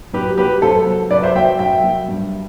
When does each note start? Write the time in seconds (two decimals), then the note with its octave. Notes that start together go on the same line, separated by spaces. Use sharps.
0.13 F#2 G4 B4
0.38 F#3 G4 B4
0.62 F#2 A4 C5
0.87 F#3
1.11 F#2 B4 D5
1.23 C5 E5
1.35 F#3 E5 G5
1.59 F#2 E5 G5
1.84 F#3
2.09 G2